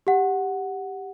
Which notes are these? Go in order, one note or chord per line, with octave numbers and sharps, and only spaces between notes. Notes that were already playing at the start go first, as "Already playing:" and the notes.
G4 F#5